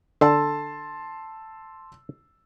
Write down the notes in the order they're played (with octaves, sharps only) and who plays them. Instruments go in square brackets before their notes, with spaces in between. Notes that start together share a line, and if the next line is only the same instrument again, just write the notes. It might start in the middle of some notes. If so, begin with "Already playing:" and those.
[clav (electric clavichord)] D3 [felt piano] A5 C6 E6